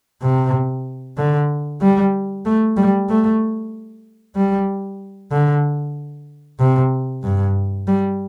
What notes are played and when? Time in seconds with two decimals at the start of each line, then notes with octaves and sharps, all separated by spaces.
0.22 C3
1.17 D3
1.81 G3
2.45 A3
2.77 G3
3.09 A3
4.36 G3
5.32 D3
6.60 C3
7.23 G2
7.88 G3